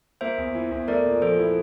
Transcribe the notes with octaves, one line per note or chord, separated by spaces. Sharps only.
A#3 C5 E5
E2
E3
E2
A3 A#4 D5
A#2
F3 A4 C5
E4